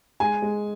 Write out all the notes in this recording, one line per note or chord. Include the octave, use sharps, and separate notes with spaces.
G#3 G#5
G#3